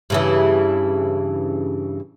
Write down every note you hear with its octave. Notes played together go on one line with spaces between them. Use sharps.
G2 C#3 E3